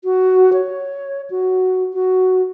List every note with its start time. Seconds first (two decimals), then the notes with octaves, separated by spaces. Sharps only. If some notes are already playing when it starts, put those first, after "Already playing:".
0.04 F#4
0.53 C#5
1.30 F#4
1.94 F#4